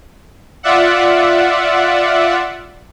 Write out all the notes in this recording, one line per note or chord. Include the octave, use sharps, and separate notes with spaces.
F4 D5 E5 F#5